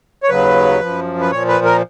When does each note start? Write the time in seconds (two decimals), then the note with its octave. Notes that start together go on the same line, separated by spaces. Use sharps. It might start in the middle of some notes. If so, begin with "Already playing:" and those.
0.23 C#5
0.29 D#2 C#3 F#3 B4
0.81 F#2 F3
1.21 B4
1.31 A#2 F3 C#5
1.48 B4
1.65 A#4